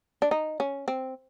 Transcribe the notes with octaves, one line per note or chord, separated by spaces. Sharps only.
D4
D#4
C#4
C4